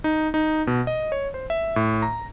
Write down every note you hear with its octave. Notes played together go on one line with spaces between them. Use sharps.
D#4
D#4
B2
D#5
C#5
C5
E5
A2
A#5